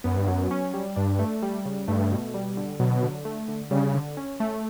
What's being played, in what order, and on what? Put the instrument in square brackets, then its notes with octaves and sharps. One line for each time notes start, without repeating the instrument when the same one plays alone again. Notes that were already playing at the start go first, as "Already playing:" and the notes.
[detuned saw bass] F#2 [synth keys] B3
[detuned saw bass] G2
[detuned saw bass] F#2 [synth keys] F#3
[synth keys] C#4
G3
[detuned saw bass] G2 [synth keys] D4
[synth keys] A3
G3
C#3
[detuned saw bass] G2 [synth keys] A3
[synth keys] B2
G3
D3
[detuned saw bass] B2 [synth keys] F#3
[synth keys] D3
A3
D3
[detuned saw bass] C#3 [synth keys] G3
[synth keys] D3
C#4
A3